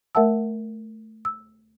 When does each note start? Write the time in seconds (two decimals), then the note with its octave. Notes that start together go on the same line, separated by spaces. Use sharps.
0.15 A3 A#4 E5 F#5 A5 E6
1.25 E6